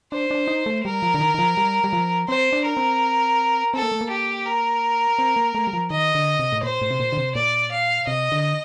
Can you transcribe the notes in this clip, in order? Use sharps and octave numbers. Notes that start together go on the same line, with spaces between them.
D4 C5
D4
D#4
A3
G3 A#4
F3
D3
D#3
D#3
F3
G3
G3
F3
C4 C5
D4
A#4
C4
C4 A4
A#3
A3
A#3
G4
A#4
C4
A#3
A3
G3
F3
D#3 D#5
D3
C3
A2
A#2 C5
A2
C3
A#2
D3
C3
A#2 D5
F5
C3 D#5
D3